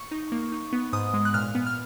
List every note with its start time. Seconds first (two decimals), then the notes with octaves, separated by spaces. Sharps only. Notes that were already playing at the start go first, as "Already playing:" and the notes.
Already playing: C#6
0.11 D#4
0.32 A#3
0.52 D#4
0.73 B3
0.93 G#2 D#6
1.14 G#3
1.25 F#6
1.34 A#2 F6
1.55 B3
1.67 F6